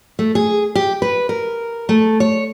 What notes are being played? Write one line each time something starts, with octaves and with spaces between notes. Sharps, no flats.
A3
G#4
G4
B4
A#4
A3
C#5